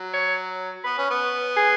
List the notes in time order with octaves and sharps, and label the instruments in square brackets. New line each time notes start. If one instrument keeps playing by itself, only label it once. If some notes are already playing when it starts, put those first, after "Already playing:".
Already playing: [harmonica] F#3
[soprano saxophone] C#5
[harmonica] B3 [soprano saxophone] B4
[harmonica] C#4
B3
[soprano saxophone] G#4